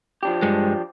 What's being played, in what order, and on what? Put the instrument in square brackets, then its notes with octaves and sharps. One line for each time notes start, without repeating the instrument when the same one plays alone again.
[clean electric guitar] F3 D4 G4
[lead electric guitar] G2 G#3